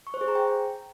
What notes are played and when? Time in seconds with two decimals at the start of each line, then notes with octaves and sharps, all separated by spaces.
0.07 C#6
0.14 C5
0.21 G#4
0.28 A#5
0.35 G5